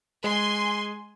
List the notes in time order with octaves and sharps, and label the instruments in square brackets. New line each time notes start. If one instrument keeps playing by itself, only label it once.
[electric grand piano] G#3 [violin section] G#5 C6